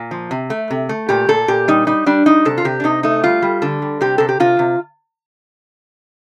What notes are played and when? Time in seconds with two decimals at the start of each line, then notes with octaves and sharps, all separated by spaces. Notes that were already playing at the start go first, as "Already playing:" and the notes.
Already playing: A#2
0.11 F3
0.31 C3
0.50 A3
0.71 C3
0.89 A3
1.09 A#2 G4
1.28 A#2 A4
1.48 A#2 G4
1.68 G3 D#4
1.87 G3 D#4
2.06 G3 D4
2.26 G3 D#4
2.45 C3 A4
2.58 F4
2.65 C3 G4
2.80 D4
2.84 C3 D#4
3.03 A3 D#4
3.24 G3 F4
3.42 G3
3.62 D3 A4
3.82 G3
4.01 C3 G4
4.18 C3 A4
4.29 G4
4.40 C3 F4
4.59 C3